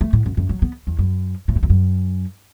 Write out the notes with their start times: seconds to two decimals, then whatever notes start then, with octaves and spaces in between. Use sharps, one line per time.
0.01 A3
0.13 A2
0.26 F#2
0.37 F#2
0.49 F#3
0.62 B3
0.87 E2
0.99 F#2
1.48 A2
1.55 F#2
1.63 E2
1.70 F#2